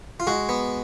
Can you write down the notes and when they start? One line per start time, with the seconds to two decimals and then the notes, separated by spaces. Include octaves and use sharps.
0.20 F4
0.27 G#3 F#4
0.49 B3